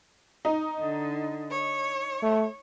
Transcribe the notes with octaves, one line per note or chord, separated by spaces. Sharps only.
D#4
D3
C#5
A3